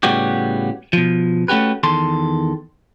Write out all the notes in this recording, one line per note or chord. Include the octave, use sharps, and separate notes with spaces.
A2 C#3 G3 B3 F#4 G4
B2 F3
A3 C#4 F#4 G4 B4
E2 D#3 A4 C6